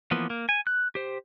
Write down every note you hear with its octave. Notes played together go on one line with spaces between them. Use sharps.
E3 F3 A#3 B3
A#3
G#5
F#6
G4 C5